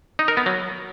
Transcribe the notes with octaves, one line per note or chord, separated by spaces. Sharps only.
D#4
A#4
B3
F#3